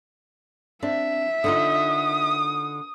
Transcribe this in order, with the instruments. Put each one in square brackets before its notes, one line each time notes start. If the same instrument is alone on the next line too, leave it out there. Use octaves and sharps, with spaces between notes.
[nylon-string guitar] C4 D4 [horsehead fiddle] E5
[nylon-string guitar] D3 D#4 F4 [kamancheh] D#6